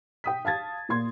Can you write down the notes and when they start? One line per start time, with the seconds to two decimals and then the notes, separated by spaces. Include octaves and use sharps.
0.24 G5 D#6 B6
0.45 F5 A5 G#6 A6
0.89 A#2 A#3 A#4 C6 G#6